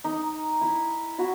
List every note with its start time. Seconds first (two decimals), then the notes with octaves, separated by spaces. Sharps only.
0.04 D#4
0.61 E4
1.18 E4 F#4